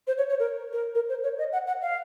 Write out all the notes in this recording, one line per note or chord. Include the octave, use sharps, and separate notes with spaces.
C5
C#5
C#5
A#4
A#4
A#4
C5
C#5
D#5
F#5
F#5
F5